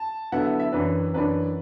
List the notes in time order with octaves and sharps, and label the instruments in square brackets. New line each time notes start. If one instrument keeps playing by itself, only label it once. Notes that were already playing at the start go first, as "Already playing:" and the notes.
Already playing: [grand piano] A5
D3 F#3 B3 E4 F#5
E5
E5
F#2 E3 D4 B4
F#2 E3 D4 B4